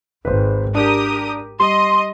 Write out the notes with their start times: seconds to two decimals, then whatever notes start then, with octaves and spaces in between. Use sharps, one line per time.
0.25 G#1 B4 C5
0.75 D4 G4 A#4 D#6
1.60 G3 D#5 C6